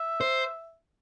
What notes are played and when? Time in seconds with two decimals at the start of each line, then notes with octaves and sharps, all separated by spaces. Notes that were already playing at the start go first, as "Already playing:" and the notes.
Already playing: E5
0.21 C5